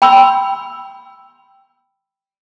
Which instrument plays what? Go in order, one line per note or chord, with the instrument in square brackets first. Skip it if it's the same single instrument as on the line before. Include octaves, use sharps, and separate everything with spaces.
[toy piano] G5 B5 C6 E6